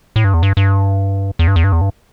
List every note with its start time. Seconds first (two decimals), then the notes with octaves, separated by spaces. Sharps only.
0.16 A2
0.24 G2
0.34 E2
0.43 G2
0.57 G2
1.39 E2
1.48 G2
1.56 E2
1.64 G2
1.72 E2
1.81 G2